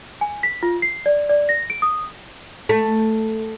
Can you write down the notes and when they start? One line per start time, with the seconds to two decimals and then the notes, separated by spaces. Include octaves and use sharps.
0.21 G#5
0.43 B6
0.63 F4
0.82 C7
1.06 D5
1.29 D5
1.49 A#6
1.70 D7
1.82 D#6
2.69 A3